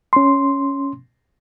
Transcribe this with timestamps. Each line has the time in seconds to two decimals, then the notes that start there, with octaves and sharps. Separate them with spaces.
0.13 C#4 C6